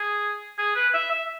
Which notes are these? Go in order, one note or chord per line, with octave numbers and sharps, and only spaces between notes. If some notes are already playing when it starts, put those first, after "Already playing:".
Already playing: G#4
G#4
B4
E5
E5